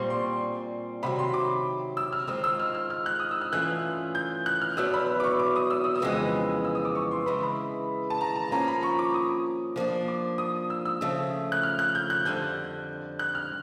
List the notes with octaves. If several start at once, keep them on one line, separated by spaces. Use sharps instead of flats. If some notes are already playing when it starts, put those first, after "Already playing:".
Already playing: A#2 G3 C4 C6 C#6
C6
C3 D#3 F#3 B5
C6
D6
E6
F6
D#3 G#3 C4 F4 E6
E6
F6
F6
F6
F#6
D#6
E6
F6
G2 E3 A3 C#4 F4 F#6
G6
F#6
F6
E2 B2 F#3 B3 E6
B5
D6
C#6
D6
D#6
E6
D#6
E6
F2 C#3 E3 G#3 B3
E6
D#6
D6
C#6
C6
C#3 E3 G#3 B5
B5
A5
A#5
A5
F3 A#3 C#4 F4 A#5
B5
C#6
D6
D#6
F3 A#3 D4
D6
D#6
E6
E6
C#3 F3 A3
F#6
F6
F#6
G6
F#6
F2 D3 G3 G6
F#6
F6